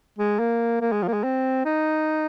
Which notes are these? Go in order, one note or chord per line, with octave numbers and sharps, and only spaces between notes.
G#3
A#3
A#3
G#3
F3
A#3
G#3
C4
D#4